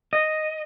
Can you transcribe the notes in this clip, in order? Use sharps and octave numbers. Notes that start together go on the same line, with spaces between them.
D#5